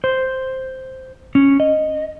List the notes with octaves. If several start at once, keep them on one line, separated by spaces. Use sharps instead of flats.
C5
C#4
D#5